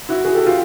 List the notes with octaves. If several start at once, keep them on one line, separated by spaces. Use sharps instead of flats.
E4 F#4
F#4 G#4
G4 A4
F4 G4